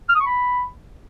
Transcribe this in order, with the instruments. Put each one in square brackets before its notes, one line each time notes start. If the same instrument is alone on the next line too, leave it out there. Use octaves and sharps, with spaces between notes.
[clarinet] F6
D#6
C#6
B5